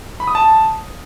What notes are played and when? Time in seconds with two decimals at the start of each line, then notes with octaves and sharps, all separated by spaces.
0.20 B5
0.27 D#6
0.35 A5